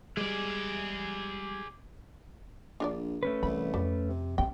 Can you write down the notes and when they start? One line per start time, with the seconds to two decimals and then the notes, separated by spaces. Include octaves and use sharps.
0.17 G3 G#3 G#4 D5
2.80 A#1 D4 A#4 D5
3.23 A3 C#4 B4
3.43 C2 E3 B5
3.74 F2 G3
4.09 C3
4.38 C3 B3 C#4 G5